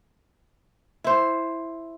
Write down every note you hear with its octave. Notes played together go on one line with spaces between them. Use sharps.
E4 C5